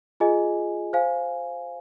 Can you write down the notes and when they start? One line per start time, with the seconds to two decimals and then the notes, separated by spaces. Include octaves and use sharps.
0.20 F4 G#4 D#5 G#5
0.93 C5 F5 G#5